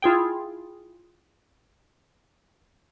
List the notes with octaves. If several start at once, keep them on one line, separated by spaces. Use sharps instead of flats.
E4 F4 G#4 G5